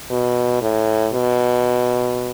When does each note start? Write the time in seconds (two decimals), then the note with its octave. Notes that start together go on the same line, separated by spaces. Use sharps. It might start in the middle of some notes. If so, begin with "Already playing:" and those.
0.10 B2
0.61 A2
1.13 B2